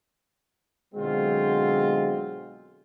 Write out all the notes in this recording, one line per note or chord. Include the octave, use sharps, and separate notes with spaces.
B2 D3 F#3 G#3 C4 F4